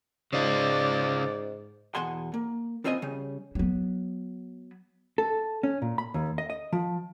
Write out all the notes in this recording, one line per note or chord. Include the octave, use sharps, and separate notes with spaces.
G#2 C#3 F4 D5
E2 B2 F#5 G#5 C6
A#3
B3 C4 F4 C5 D#5 G#5
C#3 G3
F#3 B3
A4
C#4
A#2
B5
D#2
D#5
D#5
F3